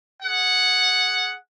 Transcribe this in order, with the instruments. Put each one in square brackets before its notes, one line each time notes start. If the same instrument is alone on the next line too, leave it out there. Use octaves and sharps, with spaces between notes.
[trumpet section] G#4 F#5